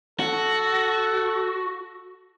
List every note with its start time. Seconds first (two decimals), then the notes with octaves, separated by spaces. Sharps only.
0.20 F#4 A4